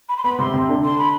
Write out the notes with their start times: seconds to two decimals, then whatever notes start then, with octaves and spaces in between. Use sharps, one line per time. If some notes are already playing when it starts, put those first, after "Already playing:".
0.09 B5
0.17 C6
0.24 B3 B5
0.39 C3 C4 C6
0.53 C3 C4
0.69 D3 D4
0.84 C6
0.98 B5